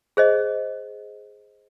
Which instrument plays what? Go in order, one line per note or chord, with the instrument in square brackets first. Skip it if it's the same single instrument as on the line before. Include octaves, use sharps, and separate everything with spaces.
[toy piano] G#4 C5 D#5